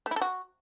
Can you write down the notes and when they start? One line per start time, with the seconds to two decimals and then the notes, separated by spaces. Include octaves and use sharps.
0.06 A3
0.11 E4
0.16 A4
0.21 F#4